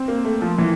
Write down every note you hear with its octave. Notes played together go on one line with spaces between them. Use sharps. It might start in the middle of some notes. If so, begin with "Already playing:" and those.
Already playing: C4
A#3
A3
F3
E3